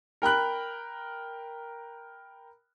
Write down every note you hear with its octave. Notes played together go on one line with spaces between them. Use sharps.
A#4 G5 B5 F#6